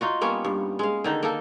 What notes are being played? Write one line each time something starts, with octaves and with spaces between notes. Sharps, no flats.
D#4 F4 F#4
G3 A#3 B3 C#4
G2
G#3 F5
D3 D#3 D#4
A#3 D#4 A4